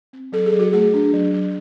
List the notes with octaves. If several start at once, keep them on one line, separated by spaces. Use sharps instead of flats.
C4
F#3 A4
G#4
F#3
F#4
A3 G#4
D4
F#3
F#3